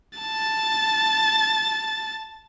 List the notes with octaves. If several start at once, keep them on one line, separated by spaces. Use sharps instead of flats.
A5 A6